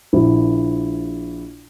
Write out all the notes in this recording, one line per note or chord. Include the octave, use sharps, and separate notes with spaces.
A#1 E4